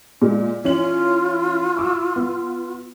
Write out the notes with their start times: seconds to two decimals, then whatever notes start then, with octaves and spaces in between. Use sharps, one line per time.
0.22 A#2 G#3
0.64 E3 C#4 F4 F#7
1.77 C#6 D6 E6
2.16 B3